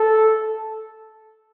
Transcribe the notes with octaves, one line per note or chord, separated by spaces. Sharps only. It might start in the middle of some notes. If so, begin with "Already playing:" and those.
Already playing: A4